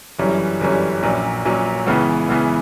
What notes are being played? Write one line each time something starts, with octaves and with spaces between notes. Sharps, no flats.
G1 F#2 E3 G3 C#4
G1 F#2 E3 G3 C#4
A#1 A#2 F#3 C#4
A#1 A#2 F#3 C#4
C#2 C#3 E3 B3
C#2 C#3 E3 B3